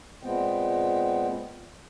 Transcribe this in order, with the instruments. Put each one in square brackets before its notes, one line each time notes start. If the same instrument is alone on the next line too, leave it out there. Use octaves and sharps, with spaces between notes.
[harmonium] A#2 G#3 B3 C4 G5